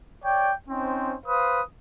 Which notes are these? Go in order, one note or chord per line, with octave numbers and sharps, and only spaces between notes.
C#5 D5 G5
C4 C#4 D#4 C5
B4 C5 F5 D#6